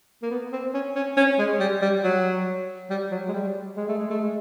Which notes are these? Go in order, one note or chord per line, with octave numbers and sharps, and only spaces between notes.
A#3
B3
C4
C#4
C#4
C#4
G#3
G3
G3
F#3
G3
F#3
G#3
G3
G#3
A3
G#3
A3
G#3